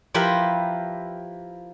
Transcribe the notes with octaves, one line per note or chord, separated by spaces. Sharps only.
F3 E4 G4 A#4 B4 E5